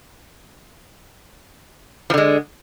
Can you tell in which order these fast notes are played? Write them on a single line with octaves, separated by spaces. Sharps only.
F3 D3 G#3